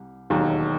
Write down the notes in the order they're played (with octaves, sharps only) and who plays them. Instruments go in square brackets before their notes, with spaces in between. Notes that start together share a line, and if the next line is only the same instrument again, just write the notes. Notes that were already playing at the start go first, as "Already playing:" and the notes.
Already playing: [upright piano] C2 G3
E1 D#2 D#3 F#3